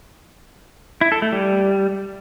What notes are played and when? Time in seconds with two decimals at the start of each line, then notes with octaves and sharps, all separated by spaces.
1.01 E4
1.12 A4
1.22 A3
1.32 G3